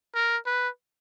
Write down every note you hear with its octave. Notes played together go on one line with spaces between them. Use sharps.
A#4
B4